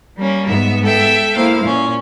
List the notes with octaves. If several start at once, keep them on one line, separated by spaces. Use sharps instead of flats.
G3 A#3 C#4
G#2 B3 E5
A4 E5 G5
A#3 E4 C5 F5
A#2 C#4